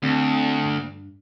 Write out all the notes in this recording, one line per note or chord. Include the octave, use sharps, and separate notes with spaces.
D2 C4
G2